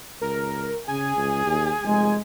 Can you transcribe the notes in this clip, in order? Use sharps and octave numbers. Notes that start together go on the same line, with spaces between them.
C#2 A#4
C#3 G#4 G#5
C#2
D#2
F1 G#3